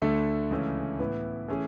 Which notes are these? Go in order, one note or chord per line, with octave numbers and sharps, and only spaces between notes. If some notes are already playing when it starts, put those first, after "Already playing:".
D2 D3 A3 D4 A4
C#2 C#3 E3 A3 C#4
A2 E3 B3 E4 B4
E3 A3 C#4 G#4